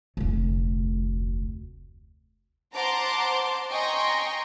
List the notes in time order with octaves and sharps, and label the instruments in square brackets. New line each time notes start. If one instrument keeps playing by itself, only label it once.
[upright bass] F1 D2
[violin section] C5 F#5 A5 A#5 C6 D6
D#5 G5 G#5 A#5 C6 C#6